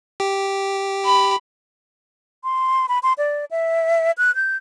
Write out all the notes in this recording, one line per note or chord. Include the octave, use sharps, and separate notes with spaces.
G4
B5
C6
B5
C6
D5
E5
F#6
G6